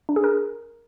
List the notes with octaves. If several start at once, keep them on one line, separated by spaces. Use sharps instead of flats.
D4
G#4
A#4